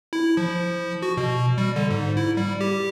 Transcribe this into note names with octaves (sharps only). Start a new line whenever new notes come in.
E4
F3
F#4
B2
G3
D3
G#2
E4
G3
G4